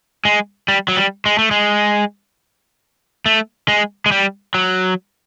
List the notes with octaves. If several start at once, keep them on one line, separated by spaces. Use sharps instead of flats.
G#3
G3
F#3
G3
G#3
A3
G#3
A3
G#3
G#3
G3
F#3